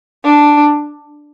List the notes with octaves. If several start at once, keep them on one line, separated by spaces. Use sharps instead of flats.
D4